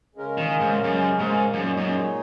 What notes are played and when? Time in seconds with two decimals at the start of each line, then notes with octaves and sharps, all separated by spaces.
0.15 C#3 G#3 C#4 A#4
0.38 D#3
0.60 G#2
0.84 F#2
1.19 G#2
1.53 F#2 A#2 G#3 D#4 G#4 C#5
1.77 F#2